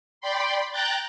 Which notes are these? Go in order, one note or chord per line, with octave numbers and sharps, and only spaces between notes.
D5 G5 B5 C6
G5 A#5 F#6 G6 A6